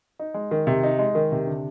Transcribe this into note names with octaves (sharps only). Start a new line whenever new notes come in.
D#4
G#3
D#3
C3
D#4
G#3
D#3
C3
D3